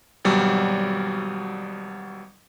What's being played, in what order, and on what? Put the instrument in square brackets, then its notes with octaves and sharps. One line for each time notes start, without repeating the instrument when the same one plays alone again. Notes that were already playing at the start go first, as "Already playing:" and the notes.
[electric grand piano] G#1 B2 F#3 G3